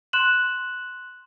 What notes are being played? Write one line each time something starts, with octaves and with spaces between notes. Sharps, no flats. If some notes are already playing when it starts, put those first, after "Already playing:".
C6 F#6 E7 F#7